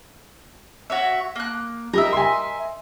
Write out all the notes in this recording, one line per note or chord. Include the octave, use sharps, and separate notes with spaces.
F#4 C#5 E5
A#3 F#6
G3 A#4 D#5 E5
G#5 C6